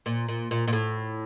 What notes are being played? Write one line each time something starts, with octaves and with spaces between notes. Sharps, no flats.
A#2
A#2
A#2
A#2
A2